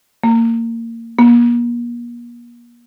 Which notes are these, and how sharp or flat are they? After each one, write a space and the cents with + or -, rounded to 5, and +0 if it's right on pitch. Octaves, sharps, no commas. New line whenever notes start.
A#3 -25
A#3 +40